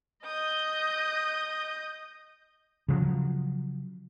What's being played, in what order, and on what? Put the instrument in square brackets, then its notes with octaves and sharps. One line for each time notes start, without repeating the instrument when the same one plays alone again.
[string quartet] D#5 D#6 G6
[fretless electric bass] C#3 F3 F#3